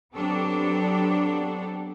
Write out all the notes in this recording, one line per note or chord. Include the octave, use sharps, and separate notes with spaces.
F#3 B3 C4 D4 G4 A4